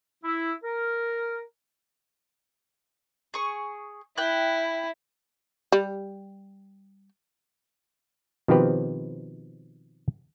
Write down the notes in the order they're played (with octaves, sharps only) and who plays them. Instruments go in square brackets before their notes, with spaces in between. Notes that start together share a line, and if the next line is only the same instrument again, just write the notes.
[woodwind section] E4
A#4
[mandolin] G#4 C#6
[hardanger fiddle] E4 [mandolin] G5 F#6
[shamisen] G3
[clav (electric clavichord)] B2 D#3 F3 C4 G4 B4